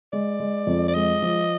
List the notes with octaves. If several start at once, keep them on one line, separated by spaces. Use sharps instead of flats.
G#3 D5
G#3
F2
D5
G#3 D#5
F3